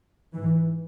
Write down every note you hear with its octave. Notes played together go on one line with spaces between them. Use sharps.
G#2 E3